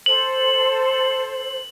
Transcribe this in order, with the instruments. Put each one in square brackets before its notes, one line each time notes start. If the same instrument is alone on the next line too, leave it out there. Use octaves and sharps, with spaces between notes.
[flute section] A4 C5 [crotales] F#7